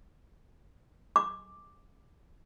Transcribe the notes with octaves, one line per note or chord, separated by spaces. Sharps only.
D6